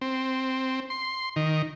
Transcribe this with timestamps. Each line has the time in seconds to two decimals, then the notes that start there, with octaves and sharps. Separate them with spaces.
0.01 C4
0.90 C6
1.36 D#3